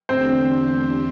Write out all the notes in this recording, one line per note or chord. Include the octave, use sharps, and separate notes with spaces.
E2 D3 A3 C4 D4 G4 C5